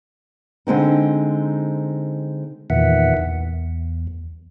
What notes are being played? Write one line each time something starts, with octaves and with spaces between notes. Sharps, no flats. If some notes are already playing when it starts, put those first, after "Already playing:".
D3 G#3 C4 D#4
E2 A#2 D#3 E3 E5 F#5
E2